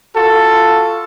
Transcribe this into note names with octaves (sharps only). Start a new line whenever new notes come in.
F4 F#4 A4